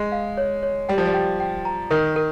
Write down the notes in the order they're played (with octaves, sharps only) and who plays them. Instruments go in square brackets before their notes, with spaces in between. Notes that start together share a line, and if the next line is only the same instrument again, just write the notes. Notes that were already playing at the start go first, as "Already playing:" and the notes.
Already playing: [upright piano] G#3
[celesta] F5
C#5
C#5
[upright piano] G3 [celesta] G5
[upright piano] F3
G3
[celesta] G5
G5
A#5
[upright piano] D#3 [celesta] A#4
[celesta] A#4